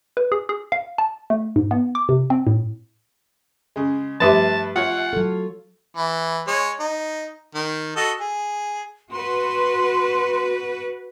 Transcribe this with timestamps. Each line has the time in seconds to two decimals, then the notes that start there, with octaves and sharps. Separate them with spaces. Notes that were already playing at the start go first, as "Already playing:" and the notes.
0.17 B4
0.32 G#4
0.49 G#4
0.72 F5
0.98 A5
1.30 A3
1.56 G#2
1.71 B3
1.95 D6
2.09 C3
2.30 C4
2.47 A2
3.76 C#3 G#3
4.20 G2 F3 A3 E4 G4 B4 A5
4.76 F4 C#5 F#5
5.13 F#3 A4
5.95 E3
6.47 G#3 C#5
6.79 D#4
7.55 D#3
7.96 F#4 A4 D#5
8.20 G#4
9.12 F#4 B4 C6